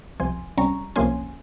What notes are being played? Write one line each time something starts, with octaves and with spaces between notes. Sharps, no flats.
C2 C3 F3 G#5 C6
C#2 C3 G3 C#4 A#5 C#6
C2 C3 F3 A#3 C#4 G#5 C6